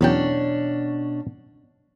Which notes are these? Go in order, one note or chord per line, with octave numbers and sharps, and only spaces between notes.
E2 B2 F#3 C#4 D4 G5